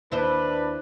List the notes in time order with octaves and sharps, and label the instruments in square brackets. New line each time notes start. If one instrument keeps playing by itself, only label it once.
[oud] D#2 E4 C5 [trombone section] D4 B4